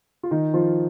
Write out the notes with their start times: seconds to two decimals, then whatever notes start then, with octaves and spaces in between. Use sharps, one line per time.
0.23 F4
0.31 D#3 D#4
0.54 F3 F4